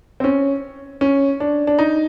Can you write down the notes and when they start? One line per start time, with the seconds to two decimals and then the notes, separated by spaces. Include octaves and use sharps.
0.20 C4
0.24 C#4
1.01 C#4
1.40 D4
1.67 D4
1.79 D#4